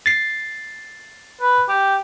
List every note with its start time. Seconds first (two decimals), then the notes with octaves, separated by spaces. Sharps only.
0.06 A6 C7
1.41 B4
1.69 G4